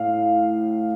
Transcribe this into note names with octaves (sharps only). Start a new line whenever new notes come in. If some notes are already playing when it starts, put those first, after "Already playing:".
Already playing: A2 F5